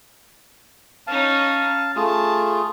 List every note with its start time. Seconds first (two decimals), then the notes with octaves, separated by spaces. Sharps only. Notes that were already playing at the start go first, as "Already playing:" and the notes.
1.07 C#4 D#4 F5 A5
1.96 A3 F4 G#4 A5